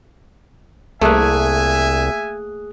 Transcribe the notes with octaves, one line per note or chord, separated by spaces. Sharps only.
C2 A3 A#3 G#4 E5 G#5 D#6 F#6